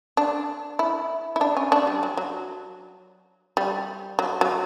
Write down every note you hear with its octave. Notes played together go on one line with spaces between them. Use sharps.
D4
E4
E4
D4
C#4
D4
G3
F#3
F#3
G3
F#3
F#3